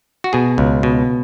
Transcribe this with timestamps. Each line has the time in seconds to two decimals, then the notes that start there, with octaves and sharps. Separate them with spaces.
0.24 F#4
0.33 B2 G#4
0.58 C#2
0.83 B2